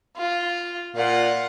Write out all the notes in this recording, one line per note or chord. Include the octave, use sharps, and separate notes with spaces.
F4
A#2 F4 F#5